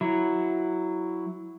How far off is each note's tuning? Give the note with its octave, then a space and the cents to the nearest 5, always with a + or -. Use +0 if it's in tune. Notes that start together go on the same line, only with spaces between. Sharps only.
F#3 +0 E4 +0